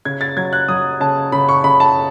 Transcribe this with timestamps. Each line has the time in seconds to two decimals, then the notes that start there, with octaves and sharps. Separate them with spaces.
0.05 C#3 G#6
0.21 A6
0.37 F#3 G#6
0.53 F#6
0.69 F#3 D#6
1.00 C#3 A5
1.32 C#3 B5
1.49 C#6
1.64 C#3 B5
1.80 A5